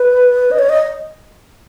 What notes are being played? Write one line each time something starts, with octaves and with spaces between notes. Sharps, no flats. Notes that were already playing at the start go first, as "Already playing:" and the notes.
Already playing: B4
D#5
C#5
D#5